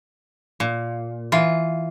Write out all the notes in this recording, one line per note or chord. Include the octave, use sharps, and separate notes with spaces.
A#2
E3 F4